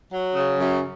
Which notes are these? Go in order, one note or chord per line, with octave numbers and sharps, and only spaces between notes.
F#3
C#3
F#2